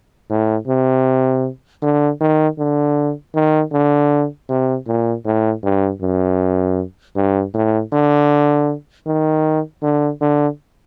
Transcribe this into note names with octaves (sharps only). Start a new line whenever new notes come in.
A2
C3
D3
D#3
D3
D#3
D3
C3
A#2
A2
G2
F#2
G2
A2
D3
D#3
D3
D3